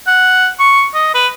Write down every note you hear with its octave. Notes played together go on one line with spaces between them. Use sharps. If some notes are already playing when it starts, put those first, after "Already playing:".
F#5
C#6
D#5
B4